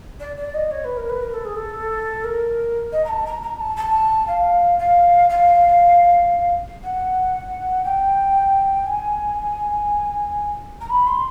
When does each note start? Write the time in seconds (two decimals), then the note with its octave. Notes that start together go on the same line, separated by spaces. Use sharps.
0.20 D5
0.37 D5
0.54 D#5
0.71 C#5
0.84 B4
0.97 A#4
1.09 B4
1.22 A#4
1.34 A4
1.45 G#4
1.56 A4
2.24 A#4
2.92 D#5
3.05 A#5
3.09 A5
3.26 A#5
3.43 A#5
3.60 A5
3.77 A5
4.28 F5
4.79 F5
5.30 F5
6.83 F#5
7.84 G5
8.87 G#5
10.81 A#5
10.90 B5
11.07 C6